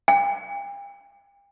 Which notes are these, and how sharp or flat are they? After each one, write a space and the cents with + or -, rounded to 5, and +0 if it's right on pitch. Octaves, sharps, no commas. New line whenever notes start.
G5 +40